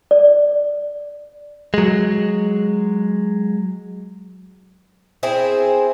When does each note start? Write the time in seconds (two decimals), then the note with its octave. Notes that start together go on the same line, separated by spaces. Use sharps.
0.11 D5
1.74 F#3 G#3
5.23 C4 E4 G#4 C5